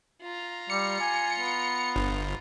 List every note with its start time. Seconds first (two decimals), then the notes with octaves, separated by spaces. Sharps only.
0.22 F4 A#5
0.70 G3 C#7
1.01 G#5
1.39 B3
1.96 G1